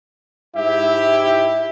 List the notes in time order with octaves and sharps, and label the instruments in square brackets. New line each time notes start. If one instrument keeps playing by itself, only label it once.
[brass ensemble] G#2 E4 G4 [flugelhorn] E5